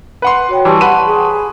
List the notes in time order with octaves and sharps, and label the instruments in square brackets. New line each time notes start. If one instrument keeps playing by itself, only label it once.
[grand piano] B4 F#5 C6
[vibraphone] F#4 C#5 G5
[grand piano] E3 G3 [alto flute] G4 [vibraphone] A5 C6 C#6
[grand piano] B4 B5 D#7 [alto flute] F#5
[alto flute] G#4